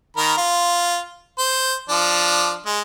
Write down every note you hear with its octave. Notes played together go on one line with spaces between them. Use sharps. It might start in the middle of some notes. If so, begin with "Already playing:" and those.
D#3 A#4 B5
F4
C5
F3 D4
G#3